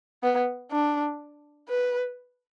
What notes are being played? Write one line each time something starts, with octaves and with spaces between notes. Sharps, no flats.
B3
D4
B4